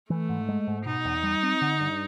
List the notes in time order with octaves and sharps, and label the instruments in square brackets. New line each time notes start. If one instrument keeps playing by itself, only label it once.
[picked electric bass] E3 [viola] A3
[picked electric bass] G#2
G#3
G#2
[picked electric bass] B2 [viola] D#4
[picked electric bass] E2
G3
C4
D3
G2